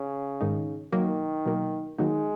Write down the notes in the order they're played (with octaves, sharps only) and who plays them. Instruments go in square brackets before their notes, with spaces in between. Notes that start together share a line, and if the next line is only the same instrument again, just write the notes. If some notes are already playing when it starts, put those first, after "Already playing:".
Already playing: [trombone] C#3
[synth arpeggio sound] G#2 D#3 G#3 D#4
[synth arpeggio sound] B2 F#3 A#3 [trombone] D#3
[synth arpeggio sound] B2 F#3 A#3
[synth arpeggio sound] D#3 F#3 A#3 D#4 [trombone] G#3